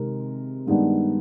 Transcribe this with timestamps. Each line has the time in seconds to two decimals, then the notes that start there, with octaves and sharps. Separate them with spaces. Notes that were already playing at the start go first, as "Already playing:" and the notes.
Already playing: C3 D#3 G#3 A#4
0.67 G2 D#3 G#3 B3 D4